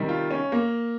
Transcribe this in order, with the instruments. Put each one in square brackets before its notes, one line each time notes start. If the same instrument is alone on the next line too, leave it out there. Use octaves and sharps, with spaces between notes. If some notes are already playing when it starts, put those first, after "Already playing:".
Already playing: [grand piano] C3 D#3 G3
F4
C#4
A#3